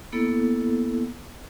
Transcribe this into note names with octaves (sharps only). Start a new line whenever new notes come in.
A#3 B3 E4 A4